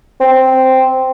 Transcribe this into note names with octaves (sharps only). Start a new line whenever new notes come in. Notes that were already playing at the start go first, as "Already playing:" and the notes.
C4